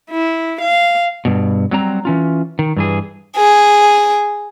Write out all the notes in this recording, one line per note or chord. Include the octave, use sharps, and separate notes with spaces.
E4
F5
G2 B2
F#3 G3 C4 A#5
E3 C#4 F4
D#3
G2 E3 G#4
G#4